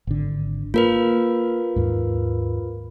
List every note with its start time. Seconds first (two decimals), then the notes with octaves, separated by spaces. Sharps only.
0.07 G#1 D3
0.74 A#3 F4 A#4 B4
1.76 D#2 G#2